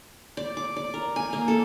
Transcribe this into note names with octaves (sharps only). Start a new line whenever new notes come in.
D5
D6
D5
A#4
G#5
A#3
A4